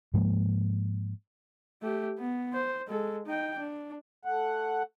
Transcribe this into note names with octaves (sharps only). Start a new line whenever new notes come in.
G#2 F3 G#3 A#3
A3 G4
B3
C5
G#3 A4
D#4 G5
D4
A3 F#5